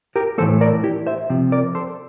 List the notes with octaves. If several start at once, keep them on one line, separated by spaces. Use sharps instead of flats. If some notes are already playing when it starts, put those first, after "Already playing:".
G4 A#4
A2 E3 A#3 A4 C5
A#4 D5
E4 G4
C5 E5
C3 F3 C4
A#4 D5
A4 C5